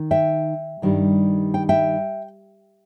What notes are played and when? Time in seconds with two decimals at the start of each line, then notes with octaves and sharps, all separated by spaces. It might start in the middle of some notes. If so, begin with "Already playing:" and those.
Already playing: D#3
0.11 E5 G5
0.82 G2 D#3 G3
1.54 G5
1.69 E5 G5